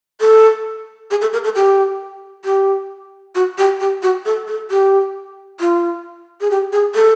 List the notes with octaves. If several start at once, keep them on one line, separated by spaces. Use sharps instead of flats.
A4
G#4
A4
A#4
A4
G4
G4
F#4
G4
G4
F#4
A4
A4
G4
F4
G#4
G4
G#4
A4